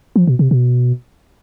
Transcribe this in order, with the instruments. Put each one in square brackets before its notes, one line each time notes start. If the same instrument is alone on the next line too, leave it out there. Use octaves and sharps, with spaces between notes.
[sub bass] F3
B2
C3
B2